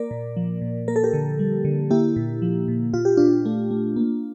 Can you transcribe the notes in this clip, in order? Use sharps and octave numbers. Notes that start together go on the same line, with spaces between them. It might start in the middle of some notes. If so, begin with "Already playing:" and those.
Already playing: A#3 A#4 D5
A#2
F3
A#2
A#3 A#4
A4
G4 A#4
D3
G3
D3
A#3 E4 G4
A#2
F3
A#2
A#2 F4
G4
A#2 D4 F4
A3
A3
A#3